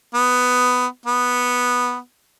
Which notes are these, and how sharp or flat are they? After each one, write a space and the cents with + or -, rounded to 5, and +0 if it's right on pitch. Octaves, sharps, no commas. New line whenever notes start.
B3 +10
B3 -5